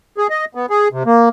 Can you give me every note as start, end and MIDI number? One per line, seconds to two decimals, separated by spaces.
0.18 0.27 68
0.30 0.45 75
0.55 0.66 59
0.70 0.88 68
0.92 1.03 48
1.06 1.29 58